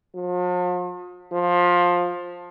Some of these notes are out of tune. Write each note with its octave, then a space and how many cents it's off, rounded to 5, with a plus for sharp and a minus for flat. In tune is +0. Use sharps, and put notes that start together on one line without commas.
F3 +45
F3 +15